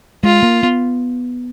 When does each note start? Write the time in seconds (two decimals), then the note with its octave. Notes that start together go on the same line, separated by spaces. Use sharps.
0.23 G#3 F4
0.43 A#3
0.63 B3